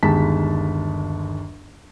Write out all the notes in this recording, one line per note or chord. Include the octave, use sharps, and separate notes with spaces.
G1 D#2 D#3 G#3 A5 B6